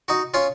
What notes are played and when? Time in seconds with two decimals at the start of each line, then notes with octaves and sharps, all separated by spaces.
0.08 D#4 F#4
0.34 C#4 F4